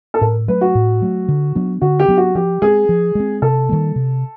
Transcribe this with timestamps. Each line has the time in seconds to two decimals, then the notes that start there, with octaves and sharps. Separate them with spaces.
0.14 A4
0.21 A2 A#4
0.48 F#3 A3 B4
0.61 F#4
0.75 A2
1.02 F#3 A3
1.28 D3
1.55 F#3 B3 D4
1.81 D3 F#4
1.99 G4
2.08 F#3 B3 D4
2.17 F#4
2.35 F3 G4
2.62 G#3 C4 G#4
2.89 F3
3.15 G#3 C4
3.42 C3 A4
3.69 D#3 G3 A#3
3.96 C3